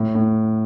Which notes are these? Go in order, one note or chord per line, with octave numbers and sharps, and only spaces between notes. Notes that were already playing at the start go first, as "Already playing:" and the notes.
Already playing: A2
A2